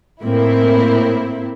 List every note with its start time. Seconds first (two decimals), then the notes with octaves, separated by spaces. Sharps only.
0.23 A2 A#3 C4 E4